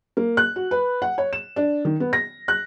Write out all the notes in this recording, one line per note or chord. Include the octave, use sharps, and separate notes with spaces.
A#3
F#6
F#4
B4
F#5
C#5
E7
D4
D#3
B3
A#6
F#6